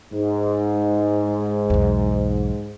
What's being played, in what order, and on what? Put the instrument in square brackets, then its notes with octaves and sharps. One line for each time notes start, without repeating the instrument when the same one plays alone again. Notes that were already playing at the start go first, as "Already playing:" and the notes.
[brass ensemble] G#2
[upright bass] B1 E2